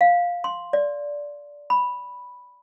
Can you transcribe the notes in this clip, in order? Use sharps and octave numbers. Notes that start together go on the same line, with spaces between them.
F5
C6
D5
B5